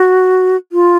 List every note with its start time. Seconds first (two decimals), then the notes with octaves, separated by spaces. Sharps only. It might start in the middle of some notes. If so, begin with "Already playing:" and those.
Already playing: F#4
0.72 F4